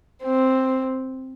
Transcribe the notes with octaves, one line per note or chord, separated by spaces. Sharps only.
C4